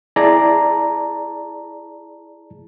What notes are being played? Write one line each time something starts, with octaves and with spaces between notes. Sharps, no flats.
E4 G#4 D5 A5 A#5